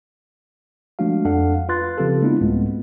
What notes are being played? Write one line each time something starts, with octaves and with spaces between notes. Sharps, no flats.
F3 G#3 A3 D4 F#4 F5
F2 D4 A4 F5 F#5
F4 B4 F5 C6 F#6 A6
C#3 F3 C4 F4 G4 A4
G#3 A#3 B3 D4 E4 F4
C2 G#2 G#3 A3 B3 C4